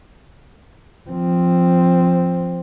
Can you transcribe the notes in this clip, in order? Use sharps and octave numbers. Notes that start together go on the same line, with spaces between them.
F3 C4